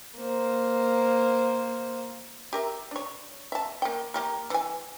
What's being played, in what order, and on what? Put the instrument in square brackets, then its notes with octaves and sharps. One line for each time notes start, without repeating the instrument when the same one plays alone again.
[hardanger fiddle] A#3 C5
[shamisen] G4 A#4 E5
D4 C#5
E5 A5
A#3 G5
A#3 G4 A#4
E3 G#5